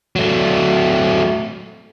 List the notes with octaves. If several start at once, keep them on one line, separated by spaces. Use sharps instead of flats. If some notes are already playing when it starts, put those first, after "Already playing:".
F#3 A3